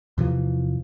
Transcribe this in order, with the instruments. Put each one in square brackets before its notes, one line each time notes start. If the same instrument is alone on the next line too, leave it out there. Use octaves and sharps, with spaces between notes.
[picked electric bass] E2 C3 E3 F3